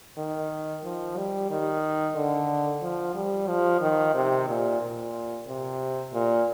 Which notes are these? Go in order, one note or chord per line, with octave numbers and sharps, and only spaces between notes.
D#3
F3
G3
D#3
D3
F3
G3
F3
D#3
C3
A#2
A#2
C3
A#2